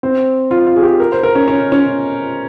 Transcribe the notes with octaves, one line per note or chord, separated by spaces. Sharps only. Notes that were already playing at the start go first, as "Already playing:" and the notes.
C4
F4
F4
G#4
G4
A#4
C5
A#4
C#4
C#4
C#4